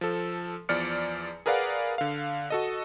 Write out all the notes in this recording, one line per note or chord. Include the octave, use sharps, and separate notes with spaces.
F3 A4
E2 F3 D5 F6 C#7
G#4 A#4 B4 D5 F5 F#5
D3 F5
F#4 A4 D#5